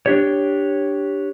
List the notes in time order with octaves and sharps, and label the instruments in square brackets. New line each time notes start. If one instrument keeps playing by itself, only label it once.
[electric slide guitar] D4 G4 C#5